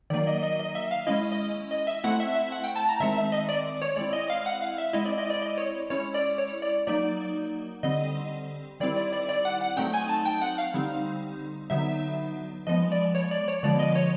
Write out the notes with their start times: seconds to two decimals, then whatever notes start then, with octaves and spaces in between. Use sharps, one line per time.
0.10 D#3 F#3 A#3 D5
0.27 D#5
0.43 D#5
0.59 D#5
0.75 E5
0.91 F5
1.07 G#3 C#4 E4 D#5
1.32 D#5
1.71 D#5
1.87 E5
2.04 A3 C4 E4 F#5
2.20 E5
2.35 E5
2.52 F#5
2.64 G5
2.76 A5
2.89 A#5
3.00 D#3 G#3 C4 E5
3.17 E5
3.32 D#5
3.49 D5
3.82 C#5
3.96 G#3 C4 E4 D5
4.13 D#5
4.30 F5
4.46 F#5
4.62 F5
4.78 E5
4.93 G#3 C4 E4 D#5
5.05 D5
5.18 D#5
5.30 D5
5.42 D#5
5.58 C#5
5.90 G#3 C#4 E4 C#5
6.14 D5
6.38 C#5
6.62 D5
6.87 F#3 A#3 D#4 D5
7.83 D3 G3 C4 D#5
8.80 D#3 G3 C4 E4 D5
8.96 D5
9.13 D5
9.29 D5
9.45 F#5
9.61 F#5
9.77 F#3 A3 C4 D#4 G5
9.94 G#5
10.09 A5
10.25 G5
10.42 F#5
10.58 F5
10.74 D3 G3 C4 D#4
11.70 D3 F#3 B3 D#4 E5
12.67 F3 G#3 B3 D#5
12.92 D5
13.15 C#5
13.31 D5
13.48 C#5
13.63 D3 F3 G#3 B3 D5
13.79 D#5
13.95 C#5